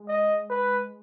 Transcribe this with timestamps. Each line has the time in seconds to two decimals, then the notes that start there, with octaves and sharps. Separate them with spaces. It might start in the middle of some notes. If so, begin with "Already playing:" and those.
Already playing: G#3
0.08 D#5
0.50 B4